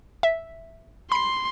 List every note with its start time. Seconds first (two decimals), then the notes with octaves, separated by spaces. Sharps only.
0.23 E5
1.12 B5 C6 C7